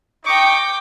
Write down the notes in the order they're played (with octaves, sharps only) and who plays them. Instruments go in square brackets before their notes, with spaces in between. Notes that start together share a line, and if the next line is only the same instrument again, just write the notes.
[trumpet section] D#4 C#6 [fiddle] G5 D6